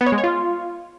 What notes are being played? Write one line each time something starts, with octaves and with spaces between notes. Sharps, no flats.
B3
C#5
G#3
C#5
F4